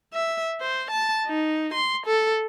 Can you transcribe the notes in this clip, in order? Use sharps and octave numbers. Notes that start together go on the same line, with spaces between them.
E5
C5
A5
D#4
C6
A4